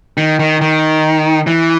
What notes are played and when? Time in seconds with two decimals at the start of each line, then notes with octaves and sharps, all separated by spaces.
0.17 D#3
0.39 D#3
0.61 D#3
1.47 E3